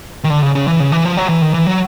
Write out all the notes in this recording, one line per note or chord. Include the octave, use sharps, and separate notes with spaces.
D#3
D3
C#3
C#3
E3
C#3
E3
F3
F#3
E3
D#3
E3
F#3